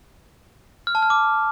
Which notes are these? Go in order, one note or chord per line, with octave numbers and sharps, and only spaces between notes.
F6
A5
F6
D6